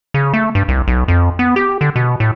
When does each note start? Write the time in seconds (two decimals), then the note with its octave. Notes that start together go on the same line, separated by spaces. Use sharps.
0.14 C#3
0.34 A3
0.55 G2
0.68 C2
0.88 B1
1.08 F2
1.39 B3
1.56 G4
1.81 D3
1.96 B2
2.20 A2